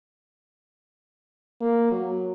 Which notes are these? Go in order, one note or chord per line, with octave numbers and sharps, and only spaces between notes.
A#3
F#3